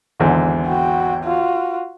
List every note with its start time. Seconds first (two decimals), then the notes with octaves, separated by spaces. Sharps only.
0.20 G#1 E2 D3
0.67 F#4 G5
1.24 F4 F#4